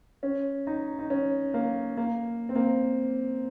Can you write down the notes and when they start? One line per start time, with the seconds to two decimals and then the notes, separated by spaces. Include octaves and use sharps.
0.23 C#4
0.67 D#4
0.99 D#4
1.10 C#4
1.54 A#3
1.97 A#3
2.49 C4
2.56 A#3